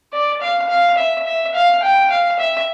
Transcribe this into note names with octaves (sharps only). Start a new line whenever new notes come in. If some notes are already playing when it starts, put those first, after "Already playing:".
D5
F5
F5
E5
E5
F5
G5
F5
E5